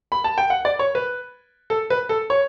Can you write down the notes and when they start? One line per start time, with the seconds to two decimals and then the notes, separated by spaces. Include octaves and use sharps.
0.12 B5
0.24 A5
0.38 G5
0.50 F#5
0.65 D5
0.79 C#5
0.95 B4
1.70 A4
1.90 B4
2.09 A4
2.30 C#5